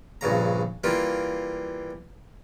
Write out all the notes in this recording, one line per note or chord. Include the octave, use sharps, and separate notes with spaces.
A#1 G2 C#3 A#5
E3 G3 A#3 F4 G4